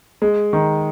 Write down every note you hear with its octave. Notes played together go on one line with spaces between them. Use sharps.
G#3
D#3